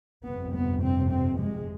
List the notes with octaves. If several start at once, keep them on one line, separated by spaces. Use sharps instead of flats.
G1 F2 C3 B3
B3
C4
C4
G#3